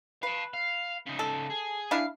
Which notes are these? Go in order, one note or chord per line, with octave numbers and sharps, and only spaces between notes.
B4 F5 A5
F5
C#3 D#4
A4
G#4
D4 E4 F5